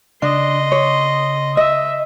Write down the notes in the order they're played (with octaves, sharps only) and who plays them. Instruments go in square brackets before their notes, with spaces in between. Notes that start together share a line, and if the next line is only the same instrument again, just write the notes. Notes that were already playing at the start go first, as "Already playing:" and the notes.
[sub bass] C#3 [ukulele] D4 [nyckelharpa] D#5 C6
[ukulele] C#5
[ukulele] D#5 [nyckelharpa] E5